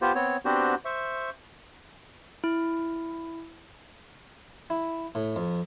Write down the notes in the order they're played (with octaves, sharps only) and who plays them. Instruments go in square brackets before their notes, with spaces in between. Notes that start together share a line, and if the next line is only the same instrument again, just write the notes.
[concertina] B3 F4 G4 C5
B3 C4 C#5
B3 C4 D4 F#4 G4 C5
C5 E5 C#6
[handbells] E4
[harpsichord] E4
A2
F2